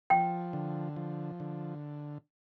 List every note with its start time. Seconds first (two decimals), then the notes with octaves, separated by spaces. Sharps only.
0.10 F3 G5
0.53 D3
0.96 F3
1.40 D3